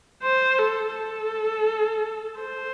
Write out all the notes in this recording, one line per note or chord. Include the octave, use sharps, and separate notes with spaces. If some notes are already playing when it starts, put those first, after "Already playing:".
C5
A4
A4
C5